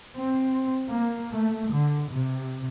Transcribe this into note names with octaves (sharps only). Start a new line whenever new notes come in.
C4
A#3
A3
D3
C3